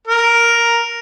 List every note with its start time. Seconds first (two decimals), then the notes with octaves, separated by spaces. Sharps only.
0.08 A#4